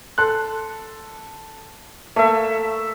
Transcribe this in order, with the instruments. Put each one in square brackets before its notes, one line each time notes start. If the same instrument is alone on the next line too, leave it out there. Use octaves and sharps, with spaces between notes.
[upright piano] A4 C6 F#6
[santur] A3 E5 [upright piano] A#3